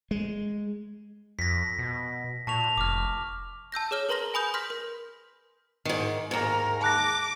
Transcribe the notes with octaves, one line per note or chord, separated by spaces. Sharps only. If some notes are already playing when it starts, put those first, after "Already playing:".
G#3
F2 A#6 B6
B2
A#2 A5 C#6 F7
F1 D6 F6
A5 E6 G6 A#6
G#4 C#5 F6 G7
A#4 B4 A#5 C6 A#6 G7
G#5 B5 D#6 G6
C6 F6 G6 A#6 B6
A#4
G#2 D#3
D#2 G#2 A#4
A5 D6 F#6 A#6